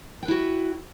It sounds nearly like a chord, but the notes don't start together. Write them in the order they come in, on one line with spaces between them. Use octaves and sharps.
G5 B4 E4 F#4